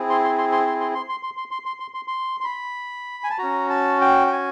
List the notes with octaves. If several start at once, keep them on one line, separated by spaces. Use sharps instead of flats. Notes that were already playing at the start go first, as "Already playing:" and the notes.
Already playing: C4 E4 G#4
C6
C6
C6
C6
C6
C6
C6
C6
C6
C6
C6
C6
C6
C6
C6
C6
B5
G#5
A5
C#4 F#4 A#5
A5
G5
G5
G#5